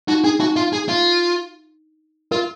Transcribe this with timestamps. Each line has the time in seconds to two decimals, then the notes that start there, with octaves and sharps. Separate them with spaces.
0.08 D#4 F#4
0.24 D4 G#4
0.40 D#4 F#4
0.56 F4
0.73 G#4
0.89 F4
2.31 F4 A#4